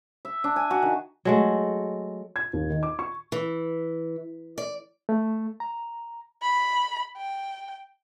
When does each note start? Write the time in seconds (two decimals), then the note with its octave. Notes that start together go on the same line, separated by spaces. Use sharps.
0.25 E5
0.44 D4
0.56 G#5
0.71 F#4
0.82 D#3
1.25 F#3 G#3 A3
2.36 G#6
2.53 D#2
2.70 D#3
2.83 D6
2.99 C#6
3.32 E3
4.58 D5
5.09 A3
5.60 A#5
6.42 B5
7.17 G5